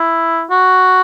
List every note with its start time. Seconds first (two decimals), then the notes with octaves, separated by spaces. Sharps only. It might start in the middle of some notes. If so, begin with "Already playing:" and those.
Already playing: E4
0.50 F#4